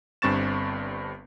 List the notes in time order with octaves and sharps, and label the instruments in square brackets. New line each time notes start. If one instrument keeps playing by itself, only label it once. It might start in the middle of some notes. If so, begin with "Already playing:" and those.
[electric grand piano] G1 G2 C4 C#6 A6 E7